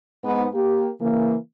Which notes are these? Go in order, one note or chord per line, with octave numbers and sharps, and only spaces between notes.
G#2 B3
A#3 G4
C#3 E3 A#3